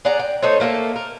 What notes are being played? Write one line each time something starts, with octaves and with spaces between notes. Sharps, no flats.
G#4 D5 F#5 A#5
G5
A3 D#4 C5 C#5
A3 A#3 G#4 A4
A#4